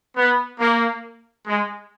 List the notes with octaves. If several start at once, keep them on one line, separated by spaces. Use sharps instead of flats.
B3
A#3
G#3